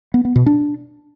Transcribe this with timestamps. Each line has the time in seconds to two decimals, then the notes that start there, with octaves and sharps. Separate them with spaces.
0.14 B3
0.25 B3
0.36 B2
0.46 D4